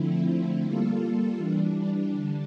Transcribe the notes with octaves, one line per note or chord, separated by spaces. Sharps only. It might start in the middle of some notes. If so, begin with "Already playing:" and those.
Already playing: D3 F3 A3 C4 E4
G3 A#3 F4 A4
E3 G3 D4
D3 G3 D4